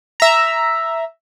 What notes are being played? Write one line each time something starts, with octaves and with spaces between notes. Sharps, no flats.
E5 A#5